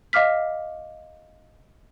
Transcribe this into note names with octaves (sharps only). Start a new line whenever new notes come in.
D#5 F5 D6 F6 B6